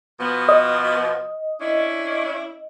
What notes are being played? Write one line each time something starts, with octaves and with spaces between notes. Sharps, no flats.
B2 F3 B3
D#5
C#4 D4 E4